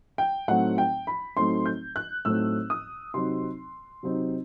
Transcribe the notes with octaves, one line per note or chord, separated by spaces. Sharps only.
G5
A2 F#3 A3 C4 D#4 F#5
G5
B5
A2 F#3 A3 C4 D#4 C6
G6
F#6
A2 F#3 A3 C4 D#4 E6
D#6
C3 F#3 C4 D#4 C6
C3 F#3 C4 D#4